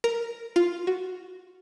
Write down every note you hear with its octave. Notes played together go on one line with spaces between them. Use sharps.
A#4
F4
F#4